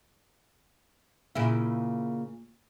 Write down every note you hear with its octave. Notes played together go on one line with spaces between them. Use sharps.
A#2 C#3 E4